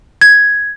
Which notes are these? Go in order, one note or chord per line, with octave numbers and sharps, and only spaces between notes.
G#6